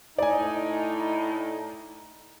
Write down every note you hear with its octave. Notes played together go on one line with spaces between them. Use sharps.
A2 D#4 D5 G#5